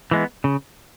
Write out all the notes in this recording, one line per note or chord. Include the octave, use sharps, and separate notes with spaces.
E3 G#3 B3
C#3